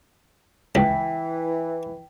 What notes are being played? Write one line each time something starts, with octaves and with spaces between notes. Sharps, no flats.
C#2 E3 G5 B6